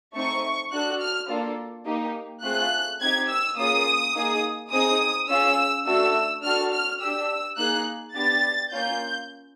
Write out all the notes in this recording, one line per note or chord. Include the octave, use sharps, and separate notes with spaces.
A3 C4 D#4 C#6
D4 F#4 A4 F#6
F6
A#3 D4 F4 A4
A#3 D#4 G4
A3 C4 F4 G#4 F#6
C4 D#4 G4 G#6
E6
A#3 C#4 F4 G#4 D#6
A#3 D#4 G#4
C4 D#4 G#4 D#6
C#4 F4 G#4 E6
A3 D4 F#4 A4 E6
D4 F#4 A4 F6
F6
D4 G4 E6
A#3 D#4 G#4 F#6
B3 D4 G4 A6
A#3 C#4 F4 G6